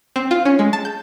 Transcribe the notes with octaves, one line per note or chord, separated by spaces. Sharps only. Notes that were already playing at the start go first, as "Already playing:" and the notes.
C4
F4
C#4
G#3
A5
G6